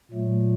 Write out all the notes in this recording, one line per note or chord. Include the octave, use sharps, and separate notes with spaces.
A#2 F#3 A3